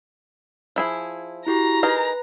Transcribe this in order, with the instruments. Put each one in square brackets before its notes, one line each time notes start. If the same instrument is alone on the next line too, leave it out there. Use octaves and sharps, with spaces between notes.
[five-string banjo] F3 E4 G#4
[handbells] E4 F#4 G4 [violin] A#5
[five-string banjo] D#4 G#4 A#4 [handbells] B4